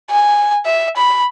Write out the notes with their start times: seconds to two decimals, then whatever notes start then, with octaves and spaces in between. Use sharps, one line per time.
0.10 G#5
0.66 E5
0.97 B5